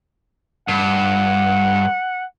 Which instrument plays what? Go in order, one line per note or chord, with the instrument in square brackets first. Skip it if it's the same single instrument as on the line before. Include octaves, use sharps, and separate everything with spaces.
[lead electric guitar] G2 [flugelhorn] F#5